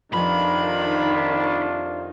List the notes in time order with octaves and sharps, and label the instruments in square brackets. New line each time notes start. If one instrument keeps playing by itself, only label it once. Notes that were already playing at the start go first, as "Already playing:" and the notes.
[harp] F2 B4 [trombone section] C3 D4 F4 [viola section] D#3 [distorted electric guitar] B5
[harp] A5 C#6